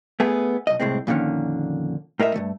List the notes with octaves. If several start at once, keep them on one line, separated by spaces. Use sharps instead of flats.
A3 B3 G#4
B1 D#5
C2 A2 G#3 C4
F2 A#2 D3 D#3 C#4
A2 A#4 D#5 E5
G2 C#3 A3